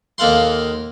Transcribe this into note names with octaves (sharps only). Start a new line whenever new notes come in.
D#2 A#3 A4 F5 F#5 C6